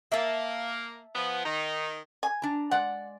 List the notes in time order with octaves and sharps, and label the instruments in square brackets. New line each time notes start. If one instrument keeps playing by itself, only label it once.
[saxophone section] A#3 [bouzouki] E5 A5
[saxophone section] F3 B3
D#3 D#4
[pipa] G#5
[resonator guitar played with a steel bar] D4 A#5
[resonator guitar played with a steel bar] G#3 D5 [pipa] F#5